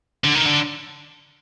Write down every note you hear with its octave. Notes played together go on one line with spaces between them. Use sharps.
D3
D#3
D3